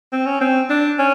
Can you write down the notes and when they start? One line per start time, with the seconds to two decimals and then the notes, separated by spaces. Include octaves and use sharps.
0.13 C4
0.26 C#4
0.41 C4
0.70 D4
0.99 C#4